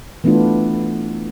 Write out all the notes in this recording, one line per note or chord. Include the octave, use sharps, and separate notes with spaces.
E3 A3 B3 D4 F4